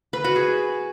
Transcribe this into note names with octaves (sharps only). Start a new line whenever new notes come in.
B4
F#4
G#4